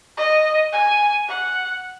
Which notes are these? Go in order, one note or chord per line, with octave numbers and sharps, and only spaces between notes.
D#5
G#5
F#5